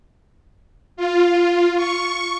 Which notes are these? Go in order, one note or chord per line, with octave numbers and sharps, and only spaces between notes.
F4
C#6